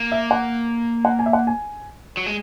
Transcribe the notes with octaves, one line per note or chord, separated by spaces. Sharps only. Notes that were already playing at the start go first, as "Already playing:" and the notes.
Already playing: A#3
E5
F#5
F#5
G#5
E5
F#5
G#5
F#3
G#3